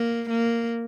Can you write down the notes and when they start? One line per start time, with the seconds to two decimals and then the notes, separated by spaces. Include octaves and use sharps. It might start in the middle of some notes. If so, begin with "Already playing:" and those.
Already playing: A#3
0.30 A#3